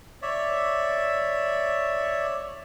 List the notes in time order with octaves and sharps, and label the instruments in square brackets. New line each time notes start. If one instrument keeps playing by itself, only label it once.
[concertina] C#5 D5 E5